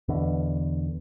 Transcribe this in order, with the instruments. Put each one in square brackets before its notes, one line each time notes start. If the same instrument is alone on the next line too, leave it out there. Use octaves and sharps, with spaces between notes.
[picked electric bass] E2 B2 D3